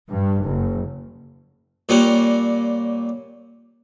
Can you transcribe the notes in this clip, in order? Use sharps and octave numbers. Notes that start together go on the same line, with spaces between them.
G2
F#1
A#2 G3 A#3 C#4 F#5